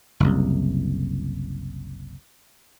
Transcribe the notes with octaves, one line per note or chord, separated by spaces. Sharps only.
F#1 C2